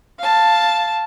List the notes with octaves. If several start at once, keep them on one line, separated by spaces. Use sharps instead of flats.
F5 A5